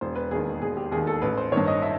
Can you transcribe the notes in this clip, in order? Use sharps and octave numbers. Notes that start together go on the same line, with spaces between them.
E1 C5
B4
D#2 D#3 G#4
E1 G#4
G4
D#2 D#3 G#4
A4
A1 B4
C5
G2 D#3 C#5
D#5
E5